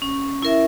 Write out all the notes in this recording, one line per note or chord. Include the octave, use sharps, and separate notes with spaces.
C#4
E4 A#4 E5